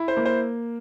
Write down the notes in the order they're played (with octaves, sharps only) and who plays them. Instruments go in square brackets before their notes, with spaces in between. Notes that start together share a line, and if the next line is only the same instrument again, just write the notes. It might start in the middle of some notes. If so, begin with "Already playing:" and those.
Already playing: [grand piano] E4
C5
A#3
C5